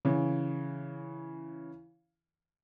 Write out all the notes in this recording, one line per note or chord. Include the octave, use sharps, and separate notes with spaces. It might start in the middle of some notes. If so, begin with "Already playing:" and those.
C#3 E3